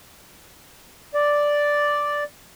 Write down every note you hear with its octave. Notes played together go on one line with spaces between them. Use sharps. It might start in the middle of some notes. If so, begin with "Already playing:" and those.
D5